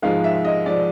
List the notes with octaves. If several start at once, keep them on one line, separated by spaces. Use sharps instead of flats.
G#2 F3 G#3 F5
E5
D#5
F3 G#3 D5